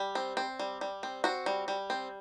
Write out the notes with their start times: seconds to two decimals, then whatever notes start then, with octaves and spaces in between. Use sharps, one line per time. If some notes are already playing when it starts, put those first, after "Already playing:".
Already playing: G3
0.15 C4
0.37 C4
0.59 G3
0.81 G3
1.03 C4
1.24 C4 F#4
1.46 G3
1.68 G3
1.90 C4